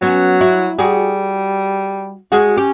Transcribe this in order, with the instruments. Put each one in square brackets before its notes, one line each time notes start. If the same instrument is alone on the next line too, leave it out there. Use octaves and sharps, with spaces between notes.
[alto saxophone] F#3 [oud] B3 C#4
[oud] E4 F#4
[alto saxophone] G3 [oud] F#4 G#4
[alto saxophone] G#3 [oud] F#4 G#4
[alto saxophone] C#4 [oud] G4